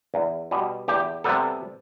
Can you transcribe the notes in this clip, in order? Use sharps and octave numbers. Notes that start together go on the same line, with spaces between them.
E2
B2 G3
E2 G4
C3 G3 B3 A4